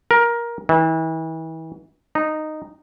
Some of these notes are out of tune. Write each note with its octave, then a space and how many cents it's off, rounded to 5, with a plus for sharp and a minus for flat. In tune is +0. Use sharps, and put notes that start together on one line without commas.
A#4 +15
E3 -35
D#4 -10